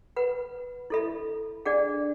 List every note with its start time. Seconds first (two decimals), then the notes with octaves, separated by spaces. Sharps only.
0.16 B4 F#5 B5
0.90 E4 A4 E5 B5
1.66 D4 G#4 D5 F#5